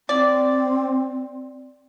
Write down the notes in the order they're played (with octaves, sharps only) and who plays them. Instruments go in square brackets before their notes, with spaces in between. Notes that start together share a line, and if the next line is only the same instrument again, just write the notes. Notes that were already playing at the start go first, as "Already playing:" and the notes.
[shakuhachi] C4 [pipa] D5